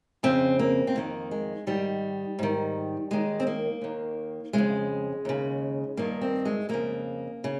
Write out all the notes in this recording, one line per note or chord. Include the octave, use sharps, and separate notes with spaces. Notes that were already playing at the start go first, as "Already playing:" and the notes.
F2 C#3 C4
A#3
C4
F2 D#3 A#3
G#3
G#2 D#3 G3
G#2 D#3
D#2 D#3 G#3
C4
A#3
D#2 D#3
F2 C#3 G#3
D#2 C#3
G2 D#3 A#3
C4
G#3
F2 C#3 A#3
C#3